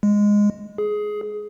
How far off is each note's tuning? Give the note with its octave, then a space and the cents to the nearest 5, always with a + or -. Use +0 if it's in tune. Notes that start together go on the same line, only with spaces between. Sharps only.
G#3 -10
G#4 +15